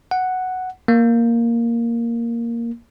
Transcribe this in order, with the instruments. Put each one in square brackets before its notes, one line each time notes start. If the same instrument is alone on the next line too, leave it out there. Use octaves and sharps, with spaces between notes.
[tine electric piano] F#5
A#3